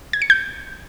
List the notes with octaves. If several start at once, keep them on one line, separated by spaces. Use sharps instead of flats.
G#6
C#7
G6